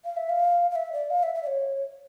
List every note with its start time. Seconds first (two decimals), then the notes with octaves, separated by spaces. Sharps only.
0.05 F5
0.17 E5
0.30 F5
0.71 F5
0.76 E5
0.93 D5
1.10 F5
1.23 E5
1.35 E5
1.43 D5
1.47 C#5